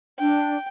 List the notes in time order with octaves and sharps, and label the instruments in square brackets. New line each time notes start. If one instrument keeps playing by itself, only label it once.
[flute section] D4 [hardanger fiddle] G5